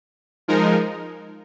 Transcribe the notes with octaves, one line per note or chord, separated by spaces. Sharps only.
F3 G#3 D#4 A#4